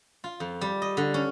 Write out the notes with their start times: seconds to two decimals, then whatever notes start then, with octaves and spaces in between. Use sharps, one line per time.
0.24 F4
0.40 F2
0.61 G3
0.82 D#5
0.97 D3
1.14 C#4